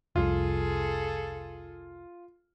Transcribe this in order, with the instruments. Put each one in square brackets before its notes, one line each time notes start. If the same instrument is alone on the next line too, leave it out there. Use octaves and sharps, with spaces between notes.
[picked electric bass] F1 C2 [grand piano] F4 [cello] G#4 A4